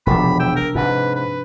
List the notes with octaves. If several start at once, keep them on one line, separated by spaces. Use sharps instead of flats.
E1 B1 C3 F3 D4 B5
G5 E6
A#4
G#2 C3 B4
B4